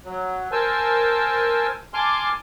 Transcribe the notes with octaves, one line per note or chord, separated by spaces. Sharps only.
F#3
A#4 C5 G#5 A5 E6
G#5 A5 C6 D6 F6